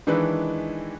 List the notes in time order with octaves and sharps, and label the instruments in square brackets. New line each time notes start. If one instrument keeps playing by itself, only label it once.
[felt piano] D#3 E3 G#3 D4 E4 B4